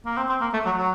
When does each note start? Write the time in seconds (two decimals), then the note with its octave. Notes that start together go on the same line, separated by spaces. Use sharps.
0.05 A#3
0.17 C4
0.29 C4
0.41 A#3
0.53 A3
0.65 F#3
0.78 F#3